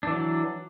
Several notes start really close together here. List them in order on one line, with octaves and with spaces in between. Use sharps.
D4 E3 F#3